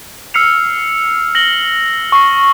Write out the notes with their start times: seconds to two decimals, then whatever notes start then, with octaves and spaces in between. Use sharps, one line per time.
0.34 E6 F6 C7 C#7 F7
1.35 A#6 F#7 G7
2.12 C#6 C7